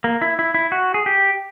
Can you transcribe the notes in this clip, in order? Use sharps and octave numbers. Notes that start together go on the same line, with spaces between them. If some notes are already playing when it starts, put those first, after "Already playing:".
A#3
E4
E4
E4
F#4
G#4
G4